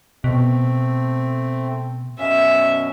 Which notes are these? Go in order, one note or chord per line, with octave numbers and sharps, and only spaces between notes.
B2 A3 C4
F#2 B2 C#4 E5